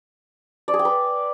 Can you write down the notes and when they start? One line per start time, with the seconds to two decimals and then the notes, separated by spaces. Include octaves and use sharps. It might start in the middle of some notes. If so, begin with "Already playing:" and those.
0.68 D5
0.74 G#4
0.79 G5
0.85 B4